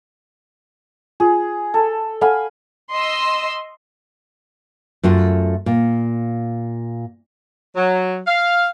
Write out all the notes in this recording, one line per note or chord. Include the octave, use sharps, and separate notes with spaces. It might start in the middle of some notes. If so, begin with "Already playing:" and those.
F4 G#4
A4
A4 F5 F#5 G#5 B5
D#5 C6 E6
F#2 A3 F4 F#5
A#2
F#3
F5